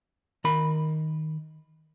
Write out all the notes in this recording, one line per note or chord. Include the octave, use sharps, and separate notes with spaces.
D#3 A#4 B5